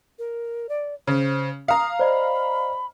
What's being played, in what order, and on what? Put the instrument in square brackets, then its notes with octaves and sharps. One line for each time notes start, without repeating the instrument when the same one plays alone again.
[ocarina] A#4
D5
[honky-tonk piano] C#3 [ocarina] C5
[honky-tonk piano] F5 A#5 [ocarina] D#6
[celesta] C5 D5 D#5 [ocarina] B5